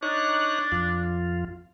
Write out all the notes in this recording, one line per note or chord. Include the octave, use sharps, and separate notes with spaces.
D4 D#4 C#5 F#6
F2 F4